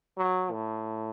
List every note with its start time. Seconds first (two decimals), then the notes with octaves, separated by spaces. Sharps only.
0.18 F#3
0.51 A2